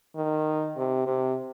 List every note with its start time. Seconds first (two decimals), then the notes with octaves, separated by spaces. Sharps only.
0.16 D#3
0.77 C3
1.06 C3